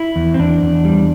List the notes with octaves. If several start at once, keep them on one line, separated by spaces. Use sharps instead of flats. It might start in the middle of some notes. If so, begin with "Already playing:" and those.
Already playing: E4
E2
C4
E2 D4
E2
G3